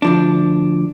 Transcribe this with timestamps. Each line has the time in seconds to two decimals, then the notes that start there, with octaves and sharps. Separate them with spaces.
0.02 D2 F3 D4